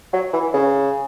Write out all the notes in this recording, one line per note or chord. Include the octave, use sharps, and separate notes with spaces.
F#3
E3
C#3